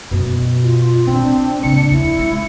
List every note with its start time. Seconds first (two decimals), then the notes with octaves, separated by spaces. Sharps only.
0.11 F#2 B2 B3
0.63 F4
1.07 D#3 E3 C4 D4
1.63 C#3 A#3 C#7
1.90 D#2 F3 E4
2.17 G#3 C#4